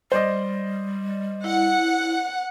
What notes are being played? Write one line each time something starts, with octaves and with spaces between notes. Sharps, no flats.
G3 C5 D5 D#5
E4 F#5